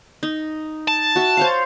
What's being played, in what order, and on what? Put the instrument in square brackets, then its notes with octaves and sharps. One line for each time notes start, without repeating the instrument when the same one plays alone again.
[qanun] D#4
[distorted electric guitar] A5
[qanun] F#4 E5
C5 C#5 F5